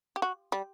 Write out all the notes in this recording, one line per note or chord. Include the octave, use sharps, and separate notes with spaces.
G4
F#4
G3